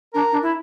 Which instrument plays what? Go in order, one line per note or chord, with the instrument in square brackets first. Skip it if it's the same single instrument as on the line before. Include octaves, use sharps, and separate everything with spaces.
[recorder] D4 [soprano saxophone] A#4
[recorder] D4
E4